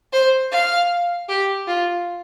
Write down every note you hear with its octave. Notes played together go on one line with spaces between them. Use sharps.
C5
F5
G4
F4